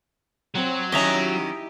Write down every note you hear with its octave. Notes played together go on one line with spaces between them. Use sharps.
F#3 C4
D#3 C#4 D#4 E4 G4 D#5 E5 A#5